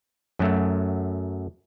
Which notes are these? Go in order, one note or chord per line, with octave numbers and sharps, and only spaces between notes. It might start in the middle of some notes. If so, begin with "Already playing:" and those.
F#2 F#3 A3